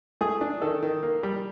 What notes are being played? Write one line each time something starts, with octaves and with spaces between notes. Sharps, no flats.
A3 G#4
D4
D#3 A4
D#3
A#3
G3